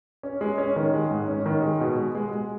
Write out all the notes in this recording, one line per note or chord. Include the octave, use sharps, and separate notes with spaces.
C#4
G#3
C#4
D#3
G#3
G#2
C#4
D#3
G#3
B2
G#3
G#3
G#3